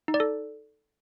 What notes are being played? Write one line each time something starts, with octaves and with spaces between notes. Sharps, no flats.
D#4
D5
A4